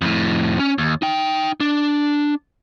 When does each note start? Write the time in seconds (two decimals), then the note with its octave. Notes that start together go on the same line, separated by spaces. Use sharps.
0.02 F2 A2
0.59 C#4
0.78 D#2
1.02 D#4 G5
1.60 D4